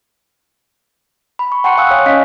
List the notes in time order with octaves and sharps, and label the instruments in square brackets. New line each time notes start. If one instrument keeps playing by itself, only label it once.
[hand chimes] B5
C#6
F#5 G5 A5 C6 C#6 C#7
F5 G#5 C#6 D#6 E6 F#6
C#5 F5 G#5
C#4 D#5 F5 G#5 B6